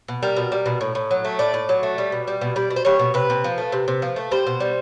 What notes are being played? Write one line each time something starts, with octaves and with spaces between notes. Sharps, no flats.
B2
G3 A#4
B2
G3
B2
A2
A2
F#3
A3
A2 D5
A2
F#3
A3
G3
B2
G3
B2
G3 D5
B2
C5
G3 C#5
B2
C3 B4
C3
F3
A3
C3
C3
F3
A3
G3 C5
B2
G3